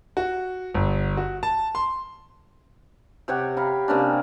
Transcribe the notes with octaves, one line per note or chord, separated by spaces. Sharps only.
F#4
G1
F#4
A5
C6
C3 G4 C#5 F#5
F5 A#5 B5
C3 A#3 C#4 D4